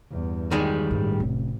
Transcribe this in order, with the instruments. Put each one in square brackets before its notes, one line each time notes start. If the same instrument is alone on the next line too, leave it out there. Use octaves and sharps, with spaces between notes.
[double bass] E2 G2
[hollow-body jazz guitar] D#3 G3 G#3
[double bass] A1 [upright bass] G2
[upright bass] F1